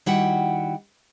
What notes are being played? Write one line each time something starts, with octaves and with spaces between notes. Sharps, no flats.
D#3 G3 E4 F#4 F#5 G5